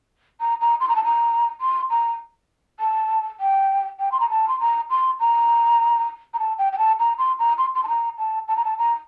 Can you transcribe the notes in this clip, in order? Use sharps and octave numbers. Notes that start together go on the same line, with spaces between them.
A#5
A#5
C6
A#5
A5
A#5
C6
A#5
A5
G5
G5
C6
A#5
A5
C6
A#5
C6
A#5
A#5
A5
G5
G5
A5
A#5
C6
A#5
C6
C6
A5
A#5
A5
A5
A#5
A5
A#5